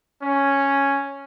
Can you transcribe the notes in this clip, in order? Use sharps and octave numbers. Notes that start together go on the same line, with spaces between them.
C#4